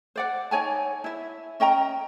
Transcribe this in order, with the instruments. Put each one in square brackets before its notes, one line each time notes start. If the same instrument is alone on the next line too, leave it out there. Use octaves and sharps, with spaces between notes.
[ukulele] C5 D5 F#5
D#4 C#5 G#5 A5
E4 E5
C#4 D#5 G5 A#5